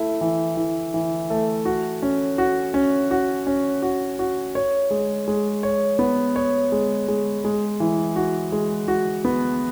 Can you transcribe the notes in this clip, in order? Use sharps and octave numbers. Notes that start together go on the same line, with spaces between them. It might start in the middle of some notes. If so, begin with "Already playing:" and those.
Already playing: A3 E4
E3
E3
E3
A3
F#4
C#4
F#4
C#4
F#4
C#4
F#4
F#4
C#5
G#3
G#3
C#5
B3
C#5
G#3
G#3
G#3
E3
F#4
G#3
F#4
B3